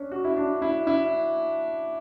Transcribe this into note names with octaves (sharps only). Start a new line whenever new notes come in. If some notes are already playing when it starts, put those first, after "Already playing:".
Already playing: C#4 D4
F#4
E4
D4
E4
E4